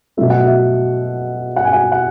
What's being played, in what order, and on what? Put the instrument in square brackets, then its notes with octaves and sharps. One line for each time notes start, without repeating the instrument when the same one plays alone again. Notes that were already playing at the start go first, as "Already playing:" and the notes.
[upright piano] B2 F#3 A3 E5
F#5
E5
F#5
G#5
F#5
F#5